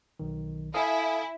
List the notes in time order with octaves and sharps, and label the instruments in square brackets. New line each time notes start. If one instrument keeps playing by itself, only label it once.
[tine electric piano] B1 D#3
[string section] E4 [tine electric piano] A4 F5 D#6 [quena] G#5